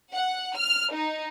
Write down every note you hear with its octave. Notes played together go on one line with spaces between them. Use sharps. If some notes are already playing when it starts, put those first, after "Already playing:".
F#5
F6
D#4